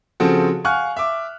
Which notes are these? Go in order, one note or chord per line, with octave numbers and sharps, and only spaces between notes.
C#3 F3 C4 F#4 A4
F5 F#5 G#5 C#6 F6 F#6
E5 D6